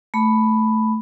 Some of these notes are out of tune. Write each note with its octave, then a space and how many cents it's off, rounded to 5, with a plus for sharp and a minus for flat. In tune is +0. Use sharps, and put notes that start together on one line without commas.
A3 +0 B5 +0